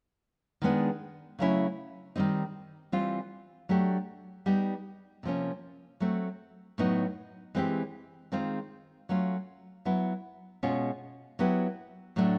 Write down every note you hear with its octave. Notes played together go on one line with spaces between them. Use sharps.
D#3 G#3 B3 D4
C#3 F#3 A3 C#4 E4
D#3 G3 C4 D#4
E3 G3 C4 F4
F#3 A3 D4 G4
G3 B3 D#4 G4
C3 F3 A#3 C#4
F#3 A3 C4
A2 F#3 B3 D#4
E3 G#3 C4 E4 G4
D#3 G#3 C4 F4
F#3 A3 C#4 F4
F#3 B3 E4
B2 G#3 C#4 F4
F#3 B3 E4 G4
A2 F#3 A3 D4